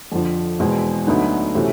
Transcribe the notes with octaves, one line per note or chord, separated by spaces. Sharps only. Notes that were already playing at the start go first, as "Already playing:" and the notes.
F2 D3 F3
E2 B2 G#3 C4
D2 D3 F#3 B3 D#4
C3 E3 A3 C#4 F#4